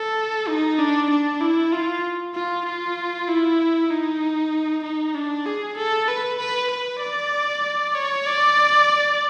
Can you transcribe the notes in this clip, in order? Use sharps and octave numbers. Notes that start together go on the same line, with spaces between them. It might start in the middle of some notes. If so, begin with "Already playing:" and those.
Already playing: A4
D#4
D4
D4
E4
F4
F4
F4
E4
D#4
D#4
D4
G#4
A4
B4
B4
B4
D5
C#5
D5